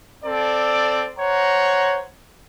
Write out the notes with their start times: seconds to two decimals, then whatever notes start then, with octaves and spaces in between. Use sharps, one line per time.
0.25 C4 A4 D5
1.19 C5 C#5 F#5 A#5